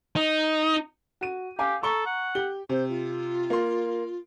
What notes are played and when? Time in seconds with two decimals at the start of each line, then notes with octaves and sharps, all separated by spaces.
0.16 D#4
1.21 F#4 D#7
1.59 G4 F5 G#5 D6
1.83 A4 A#5 C#6 G7
2.06 F#5
2.35 G4 G7
2.69 C3 C5
2.89 F4
3.50 A#3 C6